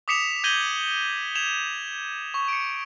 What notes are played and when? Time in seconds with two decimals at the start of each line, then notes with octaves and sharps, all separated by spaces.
0.08 D6 D#6 B6 C#7 E7 F7
0.44 G6 G#6 A#6 D#7 F#7 G7
1.35 G#6 E7 F7
2.34 C#6
2.48 C#7 D7